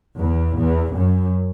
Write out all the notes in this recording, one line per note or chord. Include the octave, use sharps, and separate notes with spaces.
E2
E2
F#2